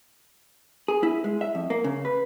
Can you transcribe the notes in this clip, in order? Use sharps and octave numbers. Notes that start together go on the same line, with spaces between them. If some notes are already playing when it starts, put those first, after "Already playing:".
G#4
E4
G#3
E5
F2
A#3
C#3
B4